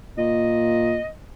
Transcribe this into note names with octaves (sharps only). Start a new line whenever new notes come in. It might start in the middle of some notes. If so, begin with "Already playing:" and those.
A#2 D#5